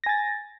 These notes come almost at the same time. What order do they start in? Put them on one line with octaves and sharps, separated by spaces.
A#6 G#5 A6